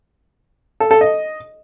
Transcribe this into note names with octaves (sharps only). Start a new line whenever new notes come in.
A4
A4
D#5